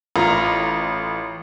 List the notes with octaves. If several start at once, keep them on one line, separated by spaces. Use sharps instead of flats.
A1 F4 A#5